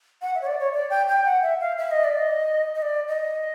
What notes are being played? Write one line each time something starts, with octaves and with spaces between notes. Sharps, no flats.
F#5
E5
C#5
D5
C#5
D5
G5
G5
F#5
E5
F5
E5
D#5
D5
D#5
D#5
D5
D#5